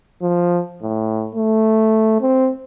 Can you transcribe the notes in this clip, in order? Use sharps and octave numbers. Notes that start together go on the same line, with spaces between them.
F3
A2
A3
C4